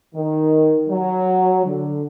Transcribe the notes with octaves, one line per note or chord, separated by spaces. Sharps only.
D#3
F#3
D3